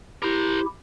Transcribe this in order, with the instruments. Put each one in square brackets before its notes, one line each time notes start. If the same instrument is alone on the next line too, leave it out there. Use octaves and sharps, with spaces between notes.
[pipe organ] E4 G4 [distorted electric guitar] A#4 C5